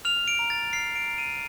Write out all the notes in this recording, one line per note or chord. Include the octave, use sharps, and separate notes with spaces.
F6 F7
D7
A#5
A6
F6 C7
D7
A#5
D#7